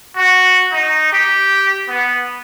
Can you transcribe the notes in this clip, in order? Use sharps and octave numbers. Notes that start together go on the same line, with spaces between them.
F#4
D#4
G4
B3